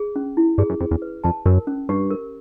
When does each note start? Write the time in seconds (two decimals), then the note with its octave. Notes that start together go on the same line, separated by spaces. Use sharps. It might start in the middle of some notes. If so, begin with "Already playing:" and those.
Already playing: G#4
0.16 C#4
0.37 E4
0.58 G2 G#4
0.70 F#2
0.80 F2 G#4
0.91 E2
1.02 B4
1.24 F2 A5
1.46 F#2 A#4
1.67 C#4
1.89 G2 G4
2.11 A#4